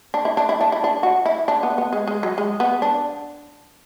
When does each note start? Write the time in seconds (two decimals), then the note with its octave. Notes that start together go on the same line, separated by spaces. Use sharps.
0.14 D4
0.25 E4
0.37 D4
0.49 E4
0.61 D4
0.72 E4
0.84 D4
1.03 F#4
1.26 E4
1.48 D4
1.63 B3
1.78 B3
1.93 G#3
2.07 G#3
2.23 F#3
2.38 G#3
2.60 B3
2.82 D4